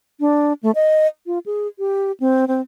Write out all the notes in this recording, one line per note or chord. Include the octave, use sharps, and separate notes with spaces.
D4
A3
D#5
F4
G#4
G4
C4
C4